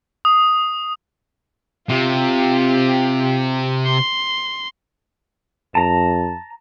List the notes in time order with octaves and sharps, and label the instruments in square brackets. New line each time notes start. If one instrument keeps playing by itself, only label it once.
[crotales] D#6
[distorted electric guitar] C3 [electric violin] F4 G4
[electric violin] C6
[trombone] F2 [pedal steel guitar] A5 A#5